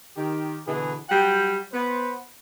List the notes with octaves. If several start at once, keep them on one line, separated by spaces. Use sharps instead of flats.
D#3 G4
B2 D3 E3 B3 G#4
F#3 G3 F#5 G5
B3 C5